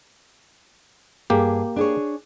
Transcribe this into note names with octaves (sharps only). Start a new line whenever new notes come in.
G2 A#3 G4 G#4
D4 G#4 C#5